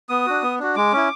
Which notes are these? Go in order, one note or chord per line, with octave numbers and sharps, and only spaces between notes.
B3 D#6
D4 F#4
B3
D4 F#4
G#3 D6
C#4 E4